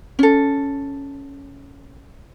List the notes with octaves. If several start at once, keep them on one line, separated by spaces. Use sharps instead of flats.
C#4 A4